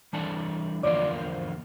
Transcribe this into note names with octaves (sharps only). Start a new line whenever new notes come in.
E3 G3 D4 A4 D5 A5
E2 D3 F3 A#3 F4 D5
C5